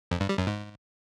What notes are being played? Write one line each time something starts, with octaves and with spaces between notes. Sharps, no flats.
F2
G2
G3
F#2
G#2